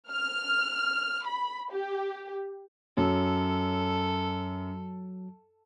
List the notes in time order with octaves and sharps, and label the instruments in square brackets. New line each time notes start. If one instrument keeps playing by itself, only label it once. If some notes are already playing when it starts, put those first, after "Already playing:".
[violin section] F6
B5
G4
[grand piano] F#2 [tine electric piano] F#3 [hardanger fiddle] A4